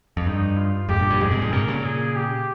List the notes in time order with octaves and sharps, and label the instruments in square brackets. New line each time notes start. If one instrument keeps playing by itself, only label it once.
[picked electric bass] F2
[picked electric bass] G2 [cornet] D#4
[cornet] F4
[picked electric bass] F2 G#2 [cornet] G4
[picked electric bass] G2 A#2
G2 A#2
[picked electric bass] F2 G#2 [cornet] G#4
[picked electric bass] G#2 C3
G2 A#2
[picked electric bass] G#2 C3 [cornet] A#4
[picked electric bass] A#2 C#3
[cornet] G#4
G4